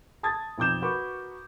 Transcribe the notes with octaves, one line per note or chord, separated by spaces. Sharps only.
A5 D#6 G#6 A6
B1 F2 D6 G6 E7
F#4 A#4 B4 B5 C#6 D6